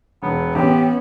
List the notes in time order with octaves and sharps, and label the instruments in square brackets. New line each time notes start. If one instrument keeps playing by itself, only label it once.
[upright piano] E1 [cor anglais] B3
[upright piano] A1 [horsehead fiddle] B3 C#4 [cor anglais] G4